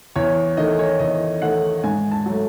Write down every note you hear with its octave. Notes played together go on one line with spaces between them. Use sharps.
E2 C#5
D#3 A3 D#5
C#5
E2 D#5
D#3 A3 F#5
G#2 G#5
A5
F#3 A3